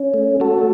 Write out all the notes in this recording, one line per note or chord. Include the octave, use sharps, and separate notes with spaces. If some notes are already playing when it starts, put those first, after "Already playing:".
Already playing: C#4
A3
A3 F#4 A4